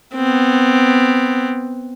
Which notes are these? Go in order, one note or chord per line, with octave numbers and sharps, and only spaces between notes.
B3 C4